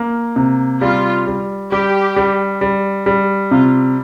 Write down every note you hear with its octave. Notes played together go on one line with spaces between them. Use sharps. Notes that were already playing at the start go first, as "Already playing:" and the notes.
Already playing: A#3
C3
G3 F4
G3
G3 G4
G3
G3
G3
C3 F4